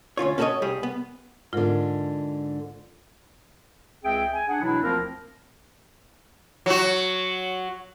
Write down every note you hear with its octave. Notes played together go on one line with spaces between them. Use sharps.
D2 C#4 F4 C#5
C#4 F#4 A4 C5 C#5 D#5
C2 G3 G4 G#4
B3
G#2 D3 F4 A#4
C#2 C4 G#4 E5 G5
G#5
D4 G#4 F#5
B2 E3 F#3 D4 E4
D2 F3 A#3 C4 F4 A#4
F#3 F#4